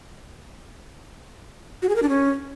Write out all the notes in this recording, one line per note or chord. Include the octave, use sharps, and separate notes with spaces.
F#4
G#4
A#4
D4
C#4